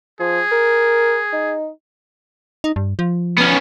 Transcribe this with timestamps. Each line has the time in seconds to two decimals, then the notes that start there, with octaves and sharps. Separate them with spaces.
0.20 F3 G#4
0.52 A#4
1.33 D#4
2.64 D#4
2.76 G2
2.99 F3
3.38 B3 C#4